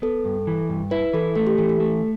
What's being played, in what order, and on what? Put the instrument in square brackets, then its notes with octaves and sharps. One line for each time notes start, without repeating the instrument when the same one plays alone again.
[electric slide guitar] B3 [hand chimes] A4
[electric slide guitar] G2
E3
G2
[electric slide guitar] E4 [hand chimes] B4
[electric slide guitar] E3 [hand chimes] A4
[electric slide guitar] A3 [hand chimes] A4
[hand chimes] G4
[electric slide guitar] E3 [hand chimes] A4
[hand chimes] A4
[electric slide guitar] A3